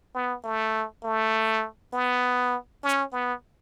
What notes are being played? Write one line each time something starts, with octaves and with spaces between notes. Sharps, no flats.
B3
A3
A3
B3
C#4
B3